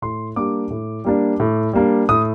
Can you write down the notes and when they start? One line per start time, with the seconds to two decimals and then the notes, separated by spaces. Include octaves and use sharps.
0.02 A2 C6
0.36 G3 A#3 D4 D6
0.70 A2
1.05 G3 A#3 D4
1.40 A2
1.73 G3 A#3 D4
2.09 A2 D#6